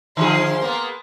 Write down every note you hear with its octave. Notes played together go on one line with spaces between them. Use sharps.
D3 F3 G#4 C6
A#3 B3